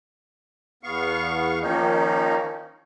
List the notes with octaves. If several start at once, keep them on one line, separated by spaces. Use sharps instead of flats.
E2 B3 F5 C#6
D#3 F3 A#3 C#4 D#4